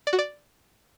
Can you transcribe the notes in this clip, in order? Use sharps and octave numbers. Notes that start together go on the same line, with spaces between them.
D5
F#4
D5